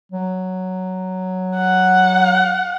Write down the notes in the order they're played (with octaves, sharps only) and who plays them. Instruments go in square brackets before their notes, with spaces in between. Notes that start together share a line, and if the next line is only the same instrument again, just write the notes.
[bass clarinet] F#3
[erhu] F#5